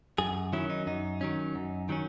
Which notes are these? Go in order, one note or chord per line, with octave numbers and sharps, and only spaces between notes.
F#2 G#4
D#3 F#3 C#4 E4
D#4
F#2 D#4
D#3 F#3 C#4
F#2
D#3 F#3 C#4